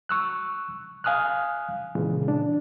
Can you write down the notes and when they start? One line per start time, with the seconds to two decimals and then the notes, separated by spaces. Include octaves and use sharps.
0.09 C#6 E6 F#6
1.04 F5 G#5 D#6 F6 F#6
1.95 A#2 C#3 E3 G#3
2.28 D4